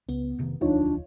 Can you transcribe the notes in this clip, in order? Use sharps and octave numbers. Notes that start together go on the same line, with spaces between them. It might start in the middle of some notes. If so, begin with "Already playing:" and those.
C#2 B3
F1 C3 D#3
E1 D2 F3 D4 D#4 F4 C#5